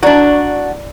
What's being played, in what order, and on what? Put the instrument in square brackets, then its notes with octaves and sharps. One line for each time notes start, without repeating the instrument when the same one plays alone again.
[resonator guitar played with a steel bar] D4 F#4 [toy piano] E4 D5 A#5